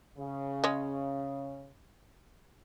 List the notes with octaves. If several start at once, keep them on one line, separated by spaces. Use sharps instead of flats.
C#3
G#3 C#4